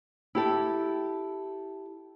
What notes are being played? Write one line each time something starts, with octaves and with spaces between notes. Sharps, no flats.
E4 G4 A4